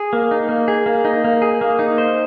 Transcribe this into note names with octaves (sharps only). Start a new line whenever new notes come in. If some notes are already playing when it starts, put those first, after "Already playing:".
Already playing: G#4
A#3
D#4
A#3
G#4
A#3
D#4
A#3
G#4
A#3
D#4
C5